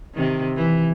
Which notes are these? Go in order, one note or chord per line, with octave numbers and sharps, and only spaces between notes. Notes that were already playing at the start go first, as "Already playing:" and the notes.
C3 D#3
E3